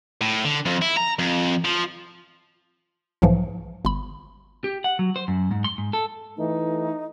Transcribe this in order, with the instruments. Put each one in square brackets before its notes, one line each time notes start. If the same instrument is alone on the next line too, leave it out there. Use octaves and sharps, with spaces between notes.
[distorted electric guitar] A2
D3
F2
E4
A#5
F2
F3
[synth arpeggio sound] B1 G#2 E3 F3
G1 B5
[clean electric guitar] G4
F#5
F#3
C5
F#2
G#2
C6
G#2
A4
[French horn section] E3 A3 [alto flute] D#4